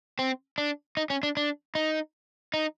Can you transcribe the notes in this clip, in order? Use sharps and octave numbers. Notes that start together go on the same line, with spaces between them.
C4
D4
D#4
C#4
D4
D4
D#4
D#4